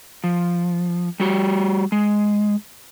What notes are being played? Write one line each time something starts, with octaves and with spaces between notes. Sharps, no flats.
F3
G3 F#4 G4
G#3